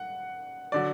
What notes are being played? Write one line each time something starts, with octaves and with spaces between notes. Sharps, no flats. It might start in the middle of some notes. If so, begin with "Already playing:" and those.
Already playing: F#5
D3 F#3 D5